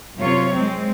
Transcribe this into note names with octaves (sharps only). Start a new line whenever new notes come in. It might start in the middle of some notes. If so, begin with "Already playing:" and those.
F#2 C3 F4 C#5
G#3 C4